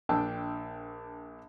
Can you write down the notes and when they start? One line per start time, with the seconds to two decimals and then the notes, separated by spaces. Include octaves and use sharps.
0.09 A#1 D4 G5 A5 E6